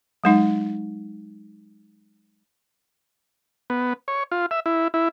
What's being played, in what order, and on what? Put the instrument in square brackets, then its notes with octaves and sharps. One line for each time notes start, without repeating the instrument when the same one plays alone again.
[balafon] F#3 G#3 D#4
[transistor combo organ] B3
C#5
F4
E5
E4
E4